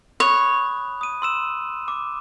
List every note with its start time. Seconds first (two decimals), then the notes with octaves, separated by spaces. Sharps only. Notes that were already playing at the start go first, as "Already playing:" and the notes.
0.20 C#5 B5 D#6 F#6
1.01 D#6 D#7
1.22 C6 E6 E7
1.88 D6